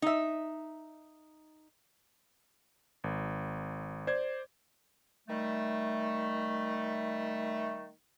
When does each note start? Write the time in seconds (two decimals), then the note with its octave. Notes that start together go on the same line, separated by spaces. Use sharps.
0.02 D#4 E5
3.04 G#1
4.07 C5 D5 G#6
5.29 D#3 G3 A3